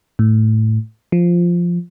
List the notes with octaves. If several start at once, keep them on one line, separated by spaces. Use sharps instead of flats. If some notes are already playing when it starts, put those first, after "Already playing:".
A2
F3